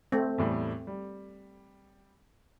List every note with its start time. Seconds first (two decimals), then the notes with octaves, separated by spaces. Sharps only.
0.12 A3 C4
0.38 E2 A2 G3
0.87 G3